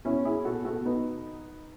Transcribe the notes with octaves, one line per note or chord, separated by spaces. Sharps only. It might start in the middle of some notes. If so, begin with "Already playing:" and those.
B2 C#4 E4
B2 E4 G#4
B2 F#4 A4
B2 F#4 A4
B2 B3 D#4